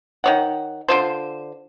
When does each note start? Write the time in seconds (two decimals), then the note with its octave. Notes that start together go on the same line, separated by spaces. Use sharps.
0.24 D#3 C#5 F#5
0.88 D3 F4 C5